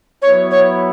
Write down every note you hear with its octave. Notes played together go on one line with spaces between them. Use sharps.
F#3 B3 E4 C#5
C#5